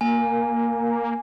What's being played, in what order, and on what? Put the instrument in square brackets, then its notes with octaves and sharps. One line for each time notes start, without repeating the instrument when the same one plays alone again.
[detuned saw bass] A#3 [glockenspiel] G#5